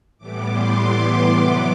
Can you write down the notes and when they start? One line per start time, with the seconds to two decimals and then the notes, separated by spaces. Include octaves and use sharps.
0.18 A2 E3 G3 B3 D6
0.48 C6
0.77 D6
1.37 C3 F#3 B3